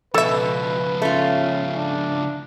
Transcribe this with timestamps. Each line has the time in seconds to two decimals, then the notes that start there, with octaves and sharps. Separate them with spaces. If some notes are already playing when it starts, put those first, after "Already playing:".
0.14 C#2 B2 F3 A4 B4 E5
1.02 A3 C#4 F4
1.74 D4